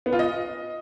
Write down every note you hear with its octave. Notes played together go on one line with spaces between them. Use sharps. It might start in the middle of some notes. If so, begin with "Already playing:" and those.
B3
F4
D#5